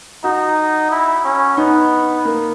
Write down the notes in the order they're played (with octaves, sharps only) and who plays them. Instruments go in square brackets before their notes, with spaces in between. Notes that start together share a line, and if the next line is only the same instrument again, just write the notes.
[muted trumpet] D#4 [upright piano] F#4
[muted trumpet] E4
C#4
[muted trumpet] B3 [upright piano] D#4
[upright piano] A#3